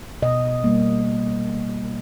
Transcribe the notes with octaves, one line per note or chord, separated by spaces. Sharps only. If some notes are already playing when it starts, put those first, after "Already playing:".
B2 D#5
G3 A#3